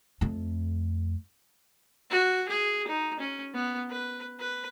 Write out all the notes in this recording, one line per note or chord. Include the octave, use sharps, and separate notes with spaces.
F2 A3
F#4
G#4
D#4
C#4
B3
B4
B4